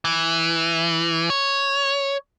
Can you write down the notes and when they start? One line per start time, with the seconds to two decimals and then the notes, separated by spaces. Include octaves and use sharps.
0.05 E3
1.30 C#5